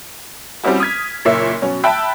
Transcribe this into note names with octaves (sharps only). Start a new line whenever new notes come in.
G3 C4 C#4 E4 F#4
D#6 F6 G#6 B6
F#1 A#2 C#5 E5
B2 F#3 C#4
E5 G5 A5 B5 E6 F#6